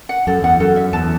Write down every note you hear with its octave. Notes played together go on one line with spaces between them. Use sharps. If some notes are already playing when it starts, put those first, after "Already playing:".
F#5
F#2 A4
E2 F#5
F#2 A4
E5
E2 A5